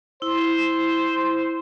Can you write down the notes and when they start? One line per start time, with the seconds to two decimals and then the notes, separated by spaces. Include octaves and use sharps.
0.22 E4 C5